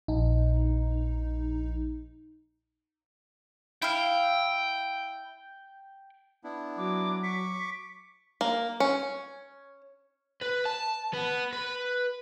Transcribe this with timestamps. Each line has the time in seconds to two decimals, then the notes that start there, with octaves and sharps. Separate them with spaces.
0.08 A#1 D#4
3.82 E4 F5 G5
6.44 B3 D4 E4
6.77 F#3 D6
7.23 C#6 D6 B6
8.41 A#3
8.80 C#4
10.42 B4
10.66 A5
11.13 B3
11.53 B4